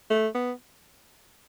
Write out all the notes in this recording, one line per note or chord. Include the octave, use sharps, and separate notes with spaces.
A3
B3